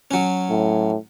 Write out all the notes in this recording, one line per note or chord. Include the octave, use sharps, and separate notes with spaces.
F#3 C#4
A2